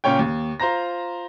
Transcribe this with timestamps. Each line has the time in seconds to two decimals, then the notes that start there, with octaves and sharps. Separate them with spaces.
0.04 A#2 C#3 C#4 C#5 G5
0.19 D#2
0.60 F4 C5 A#5 A#6